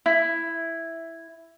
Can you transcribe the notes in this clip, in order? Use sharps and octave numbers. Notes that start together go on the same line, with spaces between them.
E4